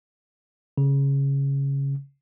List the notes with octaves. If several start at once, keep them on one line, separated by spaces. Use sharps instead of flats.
C#3